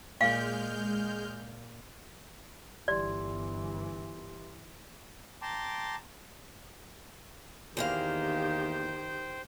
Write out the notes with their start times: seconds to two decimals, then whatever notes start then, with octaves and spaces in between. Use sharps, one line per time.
0.21 A#2 G#3 F5 F6 G6
2.88 G1 E3 G4 D5 C6
5.42 G5 A5 A#5 C6 D6
7.77 E2 D#3 A#3 G4 C5 F5 G5